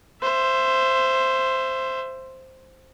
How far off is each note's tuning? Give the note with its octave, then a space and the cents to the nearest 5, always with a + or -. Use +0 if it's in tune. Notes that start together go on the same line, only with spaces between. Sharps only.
C5 +0 E5 +25